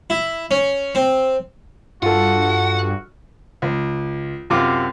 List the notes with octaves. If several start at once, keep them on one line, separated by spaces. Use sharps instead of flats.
E4
C#4
C4
G2 F4 F#4 A4 F#5
C#2
F#2 C3 F4 D6